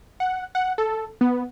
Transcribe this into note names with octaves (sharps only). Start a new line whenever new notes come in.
F#5
F#5
A4
B3